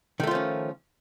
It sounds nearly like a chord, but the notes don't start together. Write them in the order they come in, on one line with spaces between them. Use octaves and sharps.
D#3 A3 F4 F3 C#4